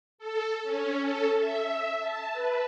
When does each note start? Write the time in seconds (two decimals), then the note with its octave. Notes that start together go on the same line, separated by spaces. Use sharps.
0.18 A4
0.63 C#4
1.03 A4
1.38 E5
2.00 A5
2.33 B4